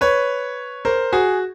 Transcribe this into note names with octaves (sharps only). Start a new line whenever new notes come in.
B4 C#5
A#4 C5
F#4 G#4